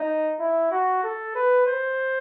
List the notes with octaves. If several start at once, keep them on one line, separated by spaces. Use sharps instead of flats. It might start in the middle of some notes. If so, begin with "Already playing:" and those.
Already playing: D#4
E4
F#4
A4
B4
C5